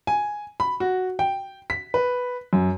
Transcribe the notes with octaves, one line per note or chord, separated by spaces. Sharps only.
G#5
B5
F#4
G5
B6
B4
F#2